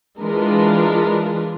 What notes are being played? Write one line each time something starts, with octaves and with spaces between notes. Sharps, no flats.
E3 G#3 D4 F4 A#4 B4